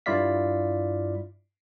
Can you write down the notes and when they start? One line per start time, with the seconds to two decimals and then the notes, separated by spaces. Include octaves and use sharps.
0.06 G2 E4 F4 D5 F5 B6